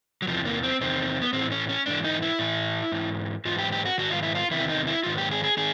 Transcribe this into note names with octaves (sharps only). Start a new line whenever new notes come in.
F#3
E2 C3 E3 F3
A#3
C4
E2 C3 D#3 C4
B3
A2 E3 C4
C#4
C#4
G#2 E3 D4
D#4
E4
A2 E3
G#2 E3
G#2 E3 F4
G4
G4
F#4
G#2 D#3 F#4
F4
E4
F4
E2 C3 D#3 E4
D#4
E4
G#2 D#3 F4
G4
G#4
G#4
D#3 G#4